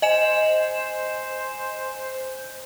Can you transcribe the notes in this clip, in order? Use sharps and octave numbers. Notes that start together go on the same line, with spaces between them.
C5 D#5 G#5 E7